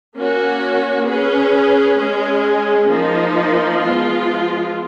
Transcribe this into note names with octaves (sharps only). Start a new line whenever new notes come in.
A#3 C#4 F#4
C#4 G#4 B4
G#3 C#4 G#4
F3 A#3 D#4
F3 G#3 B3 F4